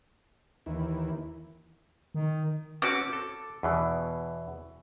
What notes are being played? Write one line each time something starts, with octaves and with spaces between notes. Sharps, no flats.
D#2 E3
D#3
C4 C#4 F#4 D6
A4
E2 B2 E3